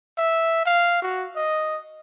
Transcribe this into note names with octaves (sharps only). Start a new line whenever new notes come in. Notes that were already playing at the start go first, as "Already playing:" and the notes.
E5
F5
F#4
D#5